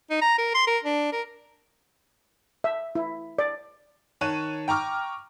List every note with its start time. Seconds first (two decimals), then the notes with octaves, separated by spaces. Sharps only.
0.10 D#4
0.21 A#5
0.38 A#4
0.54 C6
0.67 A#4
0.84 D4
1.12 A#4
2.64 E5
2.95 E4
3.39 D5
4.21 D#3 C#5 A5 F#6 D#7
4.68 G5 A#5 C#6 D6 F6